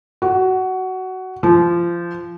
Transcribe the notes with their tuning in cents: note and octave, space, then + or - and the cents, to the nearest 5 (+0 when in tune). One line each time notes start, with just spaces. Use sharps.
F#4 +15
F3 -20